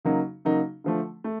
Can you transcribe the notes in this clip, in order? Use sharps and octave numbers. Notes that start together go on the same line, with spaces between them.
C#3 F#3 A#3 D#4
C#3 F#3 A#3 D#4
D3 F3 A3
A3